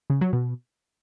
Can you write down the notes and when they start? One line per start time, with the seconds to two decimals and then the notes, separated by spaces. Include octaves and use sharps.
0.10 C#3
0.21 F#3
0.33 B2